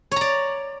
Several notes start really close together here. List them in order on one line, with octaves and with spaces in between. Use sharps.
C#5 A#5 D5